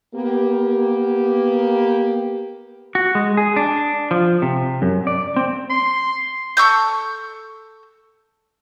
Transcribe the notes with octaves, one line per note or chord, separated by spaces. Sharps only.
A#3 B3 G4
F#4
G#3
G#4
D4
F3
C3
F#2
D5
C4
C6
A4 C#6 E6 G6